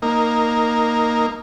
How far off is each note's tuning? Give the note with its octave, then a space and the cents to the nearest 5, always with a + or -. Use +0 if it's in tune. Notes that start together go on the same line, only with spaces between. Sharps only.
A#3 +0 D#4 +0